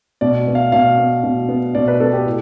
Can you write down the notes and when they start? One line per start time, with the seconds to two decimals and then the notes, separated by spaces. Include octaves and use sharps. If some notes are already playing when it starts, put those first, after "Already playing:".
0.21 B2 D5
0.47 B3
0.55 F5
0.72 B2 F5
0.98 B3
1.24 B2
1.49 B3
1.75 B2 D5
1.88 B4
2.00 B3 A4
2.13 G4
2.26 A2